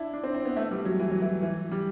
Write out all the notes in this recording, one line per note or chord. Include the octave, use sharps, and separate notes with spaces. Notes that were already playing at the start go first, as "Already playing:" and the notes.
Already playing: D4 E4
D4
C4
C4
B3
A3
G3
F#3
E3
F#3
E3
E3
G3